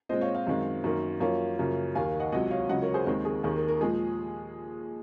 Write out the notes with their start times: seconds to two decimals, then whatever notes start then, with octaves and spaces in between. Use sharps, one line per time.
0.09 A#2 G#3 C4 C5 D#5
0.21 C#5 F5
0.34 C#5 F5
0.47 F#2 D#3 G#3 C4
0.84 F#2 D#3 A#3
1.20 F#2 F3 A#3 C#5 F5
1.58 F#2 C#3 F3 A#3
1.95 D#2 D#3 A#3 F5 G#5
2.19 D#5 F#5
2.32 C#2 C3 F#3 D#5 F#5
2.51 C#5 F5
2.69 C#2 C#3 F#3 D#5 F#5
2.82 A#4 C#5
2.94 G#4 C5
3.06 D#2 D#3 G#3 C4 A#4
3.25 G#4
3.43 D#2 D#3 A#3 G#4
3.56 A#4
3.68 A#4
3.81 A#2 F3 G#3 G#4